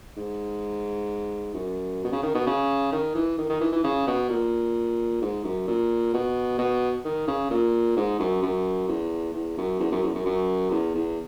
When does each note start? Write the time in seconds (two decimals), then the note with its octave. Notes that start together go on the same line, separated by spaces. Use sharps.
0.17 G#2
1.54 F#2
2.04 B2
2.12 C#3
2.23 D#3
2.35 B2
2.46 C#3
2.92 D#3
3.15 E3
3.38 D#3
3.49 D#3
3.61 E3
3.72 E3
3.84 C#3
4.07 B2
4.29 A#2
5.21 G#2
5.44 F#2
5.67 A#2
6.14 B2
6.59 B2
7.05 D#3
7.28 C#3
7.51 A#2
7.97 G#2
8.20 F#2
8.42 F#2
8.88 E2
9.33 E2
9.57 F#2
9.80 E2
9.92 F#2
10.03 E2
10.15 F#2
10.26 F#2
10.71 E2
10.95 E2